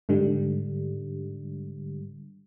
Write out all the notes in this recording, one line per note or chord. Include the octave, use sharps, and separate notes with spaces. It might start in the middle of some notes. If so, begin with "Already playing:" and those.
G#2 D3 G3